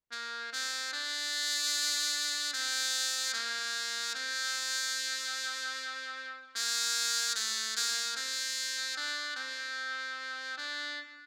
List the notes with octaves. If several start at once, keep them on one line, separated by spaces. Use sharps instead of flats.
A#3
C4
D4
C4
A#3
C4
A#3
A3
A#3
C4
D4
C4
D4